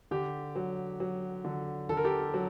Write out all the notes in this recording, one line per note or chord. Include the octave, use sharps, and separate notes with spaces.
D3 G4
F#3
F#3
D3
D3 A4
A#4
G4 A4
F#3